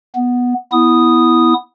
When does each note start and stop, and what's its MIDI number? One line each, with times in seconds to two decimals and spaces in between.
0.15 0.54 59
0.72 1.54 59
0.72 1.54 64
0.72 1.54 87